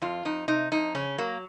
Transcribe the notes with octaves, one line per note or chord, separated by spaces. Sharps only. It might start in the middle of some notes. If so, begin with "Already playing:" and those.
F2 F4
F2 D#4
C3 D#4
F2 D#4
C#3 C#4
F#3 A#3